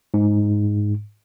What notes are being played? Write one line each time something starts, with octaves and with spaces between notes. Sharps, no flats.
G#2